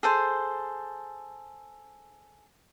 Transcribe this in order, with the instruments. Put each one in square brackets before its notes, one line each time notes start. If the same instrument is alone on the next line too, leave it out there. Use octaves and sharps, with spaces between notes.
[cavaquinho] G#4 A4 C5